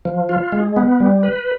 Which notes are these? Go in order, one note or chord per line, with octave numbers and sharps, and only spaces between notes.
F3
F4
G#3
B3
G3
B4